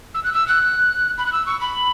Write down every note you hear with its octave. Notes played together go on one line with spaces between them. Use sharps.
E6
F#6
E6
F#6
B5
F#6
E6
C#6
B5